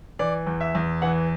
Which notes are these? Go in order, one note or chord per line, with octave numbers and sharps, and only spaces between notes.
E3 D5
E2
E5
E2
E3 F#5